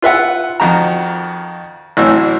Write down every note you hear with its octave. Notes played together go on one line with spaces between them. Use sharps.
F4 B4 E5 F#5
F2 D#3 F#4 A#5
A1 A2 E3 F#3 E6